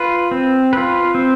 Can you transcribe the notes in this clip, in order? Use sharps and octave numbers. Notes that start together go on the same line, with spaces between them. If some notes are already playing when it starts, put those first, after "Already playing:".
Already playing: F4 B4
C4
F4 B4
C4